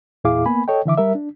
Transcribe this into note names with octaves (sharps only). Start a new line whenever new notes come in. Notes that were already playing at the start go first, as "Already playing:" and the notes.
E2 A#2 E4 G#4 F5 D6
A#3 B3 G#5 B5
A4 C#5 D#5 G5
D3 E3 E5 D6
G3 A#4 E5
D4